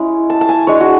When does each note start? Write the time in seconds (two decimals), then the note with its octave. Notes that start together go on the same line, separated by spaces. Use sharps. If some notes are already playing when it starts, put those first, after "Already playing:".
Already playing: G#3 C#4 E4
0.30 A5
0.41 A5
0.49 G#5
0.67 G#3 D4 C#5
0.80 F#4